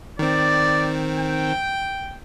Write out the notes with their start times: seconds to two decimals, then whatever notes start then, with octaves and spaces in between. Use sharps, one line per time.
0.19 D#3 C4 D5
1.20 G5